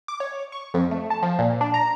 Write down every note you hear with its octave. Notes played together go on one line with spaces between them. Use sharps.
D6
C#5
C#6
F2
A3
A5
F3
A#2
D4
A#5